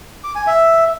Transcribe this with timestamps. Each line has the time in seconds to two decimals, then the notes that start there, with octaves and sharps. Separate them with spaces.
0.24 D6
0.35 G#5
0.47 E5